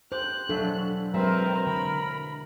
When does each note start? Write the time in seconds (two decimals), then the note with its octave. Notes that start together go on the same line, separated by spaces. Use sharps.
0.12 G4 C5 F#6
0.49 E1 F#3 D4 A4 E5
1.14 F#3 G#3 C4 A#4 B4 E5
1.67 D3 B5